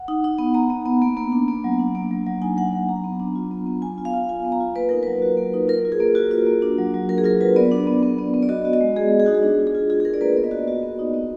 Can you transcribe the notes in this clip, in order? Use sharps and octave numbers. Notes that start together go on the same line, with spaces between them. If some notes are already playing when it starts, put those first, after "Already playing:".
Already playing: F#5
D#4
D#4
B3
B3 A#5
B3
B3
A#3
A#3
D4
A#3
F#3
D4
A#3
F#3
F#3
D#4 G#5
F#3 F#5
F#3
D4 A#5
B3
D4
F4
B3
B3
F4 G#5
F4
F5
F4
F4 G#5
B3
A#5
F4
A#3 B4
D#4 A#4
F#3 B4
F#4
A#3
D#4
F4 A#4
F4
G#4
A#3
F4 F#4
F4
A#3
D4
F#3
F#3
F#3 A#4
G#4
F4 A#4
F#3 B4
B3 D5
D4
B3
B3
B3
B3
D5
F#4 D#5
F#4
D#5
G#3
G#3 G#4
G#3
G#4
D#4 F#4
G#4
D4
F4
G#4
F4
F4 G#4
G#4
D4 A#4
D5
A#3 B4
B3 D5
D#5
F#4 D5
F#4
B3
D#4
B3